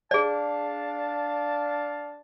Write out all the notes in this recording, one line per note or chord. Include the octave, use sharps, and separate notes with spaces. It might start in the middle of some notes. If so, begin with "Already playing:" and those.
D4 G#4 D5 F5 A5